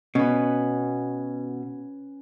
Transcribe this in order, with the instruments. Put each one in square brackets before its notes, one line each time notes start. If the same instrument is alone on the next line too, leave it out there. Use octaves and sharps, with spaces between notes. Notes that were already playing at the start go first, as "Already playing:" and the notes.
[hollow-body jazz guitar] B2 [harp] C#4 B4